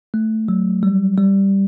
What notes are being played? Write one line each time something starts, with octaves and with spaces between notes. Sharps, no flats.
A3
F#3
G3
G3